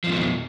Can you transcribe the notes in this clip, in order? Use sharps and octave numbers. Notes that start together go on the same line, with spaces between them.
F2 B2 F3